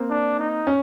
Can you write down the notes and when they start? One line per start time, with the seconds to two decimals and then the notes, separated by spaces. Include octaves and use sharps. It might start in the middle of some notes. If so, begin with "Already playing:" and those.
Already playing: A#3 C4
0.10 D4
0.39 D#4
0.67 C#4